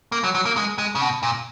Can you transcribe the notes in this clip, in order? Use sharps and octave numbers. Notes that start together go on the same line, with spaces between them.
A#3
F#3
F#3
A#3
G#3
G#3
C#3
B2
A#2